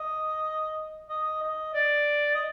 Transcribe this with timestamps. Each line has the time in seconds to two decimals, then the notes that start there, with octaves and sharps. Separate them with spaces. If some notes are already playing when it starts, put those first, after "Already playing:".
Already playing: D#5
1.09 D#5
1.42 D#5
1.74 D5
2.35 D#5